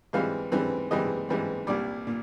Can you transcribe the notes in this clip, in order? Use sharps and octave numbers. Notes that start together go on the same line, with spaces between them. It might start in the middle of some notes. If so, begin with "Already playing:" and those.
G#2 E3 G3 C4 F5
G#2 E3 G3 C4
G#2 E3 G3 C4 D#5
G#2 E3 G3 C4
C2 A#2 G3 D5
A#2